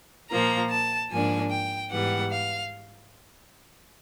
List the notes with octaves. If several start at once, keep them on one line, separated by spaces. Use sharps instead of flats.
A#2 F3 A#3 A#5
A5
G#2 F3 A#3 D4 G#5
G5
G#2 E3 G3 B3 F#5
F5